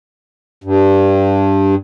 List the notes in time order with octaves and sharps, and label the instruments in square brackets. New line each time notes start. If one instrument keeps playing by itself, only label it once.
[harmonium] G2